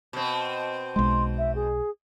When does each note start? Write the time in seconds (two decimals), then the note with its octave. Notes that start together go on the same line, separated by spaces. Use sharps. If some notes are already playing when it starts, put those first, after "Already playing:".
0.13 B2 C4
0.96 B1 G#3 C6
1.38 E5
1.55 G#4